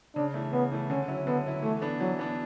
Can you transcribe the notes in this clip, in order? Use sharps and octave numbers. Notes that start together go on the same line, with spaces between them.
C#3 D4
E3 A3
C#3 B3
E3 A3
D3 C#4
F#3 C#4 E4
D3 B3
F#3 C#4 E4
E3 A3
B3 D4
E3 F#3
B3 D4